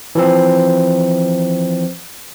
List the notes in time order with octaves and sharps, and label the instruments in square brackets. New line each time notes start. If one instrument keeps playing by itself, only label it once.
[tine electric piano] E3 F3 C4